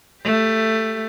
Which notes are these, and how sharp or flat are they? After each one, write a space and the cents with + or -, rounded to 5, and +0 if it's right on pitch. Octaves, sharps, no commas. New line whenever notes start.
A3 +10 G4 +15